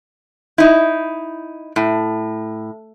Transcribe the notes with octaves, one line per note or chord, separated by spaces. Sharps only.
D#4 E4
A2